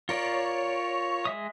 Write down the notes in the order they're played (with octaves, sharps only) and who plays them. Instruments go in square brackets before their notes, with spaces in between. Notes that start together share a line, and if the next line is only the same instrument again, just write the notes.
[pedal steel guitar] F4 A#4 D5 [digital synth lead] C#5
[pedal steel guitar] G#3 E5 D#6